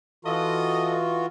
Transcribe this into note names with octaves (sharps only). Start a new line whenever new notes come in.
E3 F4 F#4 A4 D#5